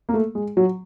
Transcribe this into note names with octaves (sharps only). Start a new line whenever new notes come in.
A#3
A3
G#3
F#3